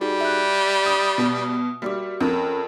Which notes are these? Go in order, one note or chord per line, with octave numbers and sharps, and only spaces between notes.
G3 D#4 F#4 G#4
E5 F#6
D#6
B2
G3 A#3 F#4 D6
F2 C4 C#4 A#4